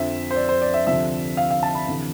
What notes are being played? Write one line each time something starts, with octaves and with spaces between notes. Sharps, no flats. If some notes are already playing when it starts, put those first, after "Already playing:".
Already playing: F2 D3 F3 E5
C5
D5
C5
D5
E5
D2 C3 F3 E5
F5
F5
A5
B5
D2 C3 E3